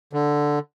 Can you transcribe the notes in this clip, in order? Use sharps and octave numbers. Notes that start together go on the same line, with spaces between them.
D3